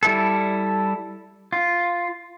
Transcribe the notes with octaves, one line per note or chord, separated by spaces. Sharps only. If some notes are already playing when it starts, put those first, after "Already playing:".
G3 E4 A4
F4